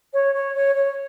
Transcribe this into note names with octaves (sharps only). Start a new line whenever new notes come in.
C#5
C#5
C#5
C#5